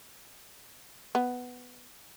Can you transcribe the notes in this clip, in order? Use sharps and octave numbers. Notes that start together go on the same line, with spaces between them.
B3